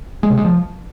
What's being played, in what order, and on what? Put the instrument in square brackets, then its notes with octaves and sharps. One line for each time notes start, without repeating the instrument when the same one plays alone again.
[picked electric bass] G#3
C3
G#3
F3